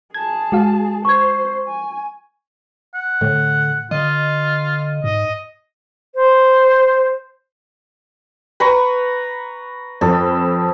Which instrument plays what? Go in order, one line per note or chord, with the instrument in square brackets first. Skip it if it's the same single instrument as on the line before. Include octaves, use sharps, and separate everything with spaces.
[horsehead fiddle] G#4 A5 [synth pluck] G#6
[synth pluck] G#3 F#4 F5
[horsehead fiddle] C5 [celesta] C#6 G#6
[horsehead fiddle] G#5
[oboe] F#5
[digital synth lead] A2 [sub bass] D3
[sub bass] D3 [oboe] F4 [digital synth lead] D#5
[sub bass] G#2 [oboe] D#5
[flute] C5
[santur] B4 A#5 C#6
[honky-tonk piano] F2 [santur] A4